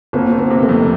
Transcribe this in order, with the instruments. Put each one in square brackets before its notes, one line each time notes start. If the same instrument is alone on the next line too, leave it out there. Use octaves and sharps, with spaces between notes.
[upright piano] G1 [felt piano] A#3 C4
[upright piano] G1
[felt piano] A#3 C4
[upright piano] C3
[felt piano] A3 B3
[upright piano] F2